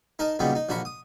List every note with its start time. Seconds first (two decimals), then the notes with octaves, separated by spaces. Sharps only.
0.19 D#4 A#4 D#5 A5
0.39 F#2 A#2 C#3 G3 B3 D#4
0.55 D#4
0.69 A#1 D3 F#4 A#4 B5 C#6
0.85 D#6